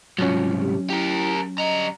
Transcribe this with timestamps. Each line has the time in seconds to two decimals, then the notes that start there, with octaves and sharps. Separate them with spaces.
0.18 C2 G#2 F#3 C#4 F4
0.61 G4
0.90 E4 G4 A#4
1.58 G3 D#5 A#5